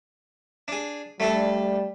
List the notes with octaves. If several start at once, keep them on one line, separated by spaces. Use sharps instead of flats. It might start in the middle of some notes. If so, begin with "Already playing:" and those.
D4 G#4
G3 A3 D4 A4